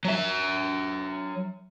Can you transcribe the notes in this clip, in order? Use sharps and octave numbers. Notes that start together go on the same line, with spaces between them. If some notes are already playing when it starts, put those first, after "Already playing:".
F#3 E5